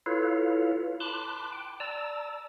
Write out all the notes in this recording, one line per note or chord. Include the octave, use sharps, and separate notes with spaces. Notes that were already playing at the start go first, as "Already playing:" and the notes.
E4 F4 A4 B4 C#5 F5
A5 B5 C6 D6 F#6
G5
D5 A5 A#5 E6